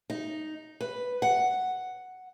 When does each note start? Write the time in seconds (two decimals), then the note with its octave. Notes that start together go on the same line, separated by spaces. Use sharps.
0.10 D#4
0.81 B4
1.22 F#5